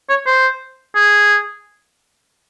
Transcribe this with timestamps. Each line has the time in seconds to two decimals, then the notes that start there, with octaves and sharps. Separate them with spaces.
0.09 C#5
0.27 C5
0.96 G#4